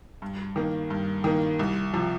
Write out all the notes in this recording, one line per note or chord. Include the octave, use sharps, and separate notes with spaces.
G2
D#3 A#3
G2
D#3 A#3
C2
C3 F3